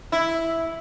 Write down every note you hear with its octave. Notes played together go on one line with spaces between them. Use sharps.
E4